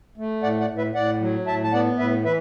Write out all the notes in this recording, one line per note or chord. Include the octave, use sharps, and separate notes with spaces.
A3
A2 D5 F#5
D5 F#5
A2
B4 E5
A2 D5 F#5
F#3
A2 E5 A5
A5
B3 D5 F#5
A2 B4 E5
E3 B4 E5